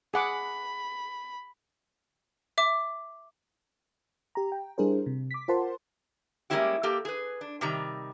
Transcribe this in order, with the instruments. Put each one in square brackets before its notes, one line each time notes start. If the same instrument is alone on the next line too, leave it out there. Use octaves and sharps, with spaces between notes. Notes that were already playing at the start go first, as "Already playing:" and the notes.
[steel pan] G#4 F#5 D6 [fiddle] B5
[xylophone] E5 D6
[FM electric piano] G4 A#5
G5
G3 D4 E4 G#4 A#4 C5
C3
D6 B6
F4 A#4 C5 F#5 A5 C6
[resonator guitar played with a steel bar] G3 G#3 A#3 C#4 E4 G4
A#3 G4 A4
G#4 B4
D4
C3 D#3 G3 A#5